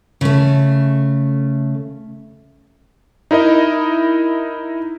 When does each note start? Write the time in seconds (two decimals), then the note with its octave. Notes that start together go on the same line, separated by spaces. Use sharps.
0.21 C#3 A3
3.31 D#4 E4 A#4 D#5